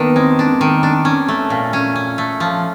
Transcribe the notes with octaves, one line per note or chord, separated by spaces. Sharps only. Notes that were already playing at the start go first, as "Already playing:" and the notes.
Already playing: D#3 A#3 B3 D4
G#3 C4
D4
D#3
D4
C#4
A3
A#2
C#4
C#4
A3
F3